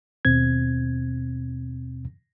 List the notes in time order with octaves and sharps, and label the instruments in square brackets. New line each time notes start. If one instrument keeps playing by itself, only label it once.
[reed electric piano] D#2 B2 C4 G#6